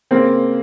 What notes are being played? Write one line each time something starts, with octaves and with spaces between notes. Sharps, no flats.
C#3 A#3 C4